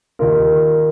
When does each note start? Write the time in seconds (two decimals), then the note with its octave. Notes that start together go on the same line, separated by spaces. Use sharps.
0.19 D#2 D#3 A#3 F4 A#4